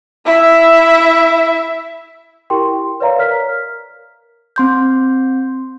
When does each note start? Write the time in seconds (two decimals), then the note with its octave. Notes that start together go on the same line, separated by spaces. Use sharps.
0.26 E4 E5
2.50 E4 G4 A#4 G5 C6
3.00 B4 C#5 D5 E5 F5 A#5
3.18 A#4 E5 F6 B6
4.56 C4 C6 G6